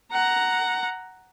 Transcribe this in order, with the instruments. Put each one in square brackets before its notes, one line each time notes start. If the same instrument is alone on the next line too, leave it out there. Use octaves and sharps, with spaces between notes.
[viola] F#5 A#5